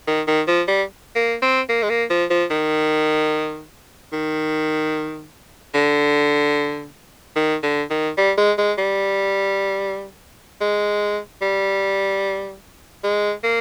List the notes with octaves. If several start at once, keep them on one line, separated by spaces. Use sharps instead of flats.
D#3
D#3
F3
G3
A#3
C4
A#3
G#3
A#3
F3
F3
D#3
D#3
D3
D#3
D3
D#3
G3
G#3
G#3
G3
G#3
G3
G#3
A#3